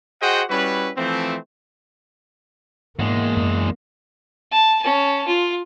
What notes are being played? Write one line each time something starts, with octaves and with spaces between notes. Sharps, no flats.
F#4 G#4 C5 D#5 F#5 G5
G3 C#4 E4 F#4 B4
E3 F3 A3 C4
E2 G#2 G#3 A#3
F#2
A5
C#4 A5
F4